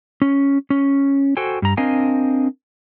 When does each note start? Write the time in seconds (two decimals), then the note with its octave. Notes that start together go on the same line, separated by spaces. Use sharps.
0.22 C#4
0.70 C#4
1.37 F#4 A4 C5 G5 G#5
1.62 G2 A#5
1.77 C4 D4 A#4 D#5 F5 G#5